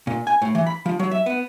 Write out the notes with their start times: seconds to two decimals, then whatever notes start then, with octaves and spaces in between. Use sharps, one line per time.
0.07 A#2
0.27 G#5
0.42 A2
0.55 E3
0.66 B5
0.86 F3
0.99 F#3
1.11 E5
1.26 B3